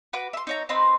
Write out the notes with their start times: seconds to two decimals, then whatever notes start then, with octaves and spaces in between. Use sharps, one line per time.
0.13 F#4 B4 D6
0.33 E5 C6
0.47 D#4 C#5 A#5
0.69 C4 D#4 B4 C6